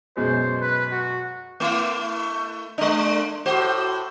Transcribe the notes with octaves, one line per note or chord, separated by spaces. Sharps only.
F#2 B2 G#3 C5
B4
F#4
A3 E4
G#3 D4
A2 F#4 C5